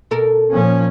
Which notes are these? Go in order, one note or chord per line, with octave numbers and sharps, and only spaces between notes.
B2 A4 A#4
A#2 F3 C#4